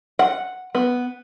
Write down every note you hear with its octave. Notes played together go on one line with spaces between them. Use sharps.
F#5
B3